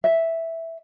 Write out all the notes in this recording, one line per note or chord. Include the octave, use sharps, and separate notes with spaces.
E5